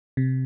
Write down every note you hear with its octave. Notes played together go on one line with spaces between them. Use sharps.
C3